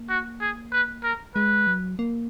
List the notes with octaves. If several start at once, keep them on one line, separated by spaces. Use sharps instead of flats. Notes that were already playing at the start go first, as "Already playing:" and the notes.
Already playing: A#3
F#4
G#4
B4
A#4
G#3 B4
F#3
A#3